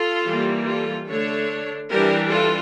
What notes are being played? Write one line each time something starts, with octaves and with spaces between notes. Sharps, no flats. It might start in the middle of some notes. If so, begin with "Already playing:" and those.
Already playing: F4 A4
E3 G3 A#3
F4 A4
D3 A3 D4 A4 C#5
E3 G3 D4 G4 A#4
F4 A4